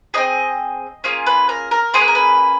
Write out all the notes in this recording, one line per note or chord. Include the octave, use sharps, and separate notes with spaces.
C4 D#4 G#4 D#5
A#3 C#4 F4 G#4
B4
A#4
A#4
A#3 C#4 G#4 C5
B4
A#4
B4